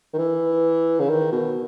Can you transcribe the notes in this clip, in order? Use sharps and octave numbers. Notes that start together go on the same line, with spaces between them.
D#3
E3
C#3
D#3
B2